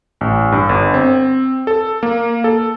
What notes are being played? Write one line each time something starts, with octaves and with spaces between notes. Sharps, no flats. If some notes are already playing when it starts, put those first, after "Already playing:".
A1
G2
G1
C4
A4
A#3
A4